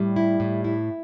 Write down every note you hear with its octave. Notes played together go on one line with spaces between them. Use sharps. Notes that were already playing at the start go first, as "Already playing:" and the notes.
Already playing: A2 G3
E4
A2
E4